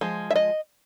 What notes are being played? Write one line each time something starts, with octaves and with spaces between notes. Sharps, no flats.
F3 G#3
E5
D#5